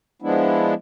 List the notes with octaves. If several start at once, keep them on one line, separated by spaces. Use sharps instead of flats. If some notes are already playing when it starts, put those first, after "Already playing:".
F3 G#3 B3 D4 E4